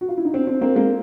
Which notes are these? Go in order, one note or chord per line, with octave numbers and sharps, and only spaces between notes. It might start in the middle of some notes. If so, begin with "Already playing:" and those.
F#4
F4
E4
D#4
C4 D4
C4 D4
A#3 C4
G#3 A#3